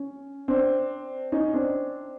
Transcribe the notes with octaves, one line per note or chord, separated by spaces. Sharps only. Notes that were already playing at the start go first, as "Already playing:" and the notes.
Already playing: C#4
C4 D4
C#4 D#4
C4 D4